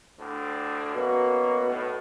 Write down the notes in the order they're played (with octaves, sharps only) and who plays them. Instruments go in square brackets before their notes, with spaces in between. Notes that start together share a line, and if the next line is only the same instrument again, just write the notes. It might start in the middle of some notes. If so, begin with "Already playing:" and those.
[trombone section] D2 A2 D4
[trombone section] F#2 A#3 F#4 [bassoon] B2
[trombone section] B1 A2